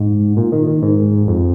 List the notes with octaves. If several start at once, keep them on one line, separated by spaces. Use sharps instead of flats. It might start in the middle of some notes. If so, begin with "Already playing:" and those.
Already playing: G#2
A#2
D#3
D#3
G#2
F2